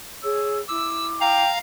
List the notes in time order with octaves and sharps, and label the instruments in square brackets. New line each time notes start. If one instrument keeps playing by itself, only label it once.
[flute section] G#4 C#5 E6
[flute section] E4 D6 [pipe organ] E6
[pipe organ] F5 A#5 [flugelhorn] G5